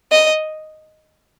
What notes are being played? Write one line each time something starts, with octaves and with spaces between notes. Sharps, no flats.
D#5